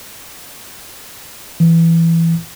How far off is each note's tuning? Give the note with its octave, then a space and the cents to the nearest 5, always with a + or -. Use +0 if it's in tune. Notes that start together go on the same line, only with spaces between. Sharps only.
E3 +10